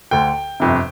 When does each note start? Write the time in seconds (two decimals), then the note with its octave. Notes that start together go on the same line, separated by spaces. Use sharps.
0.11 D2 D3 G5
0.60 G1 F2 C3